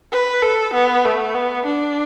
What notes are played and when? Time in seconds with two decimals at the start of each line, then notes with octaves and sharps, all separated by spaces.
0.12 B4
0.42 A4
0.74 B3
1.05 A3
1.35 B3
1.65 D4